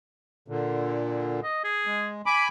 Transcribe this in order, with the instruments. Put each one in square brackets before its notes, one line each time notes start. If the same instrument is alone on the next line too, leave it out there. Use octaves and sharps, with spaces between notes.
[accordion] A#2 D3
[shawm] D#5
G#4
[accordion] G#3
[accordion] G#5 B5 [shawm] D6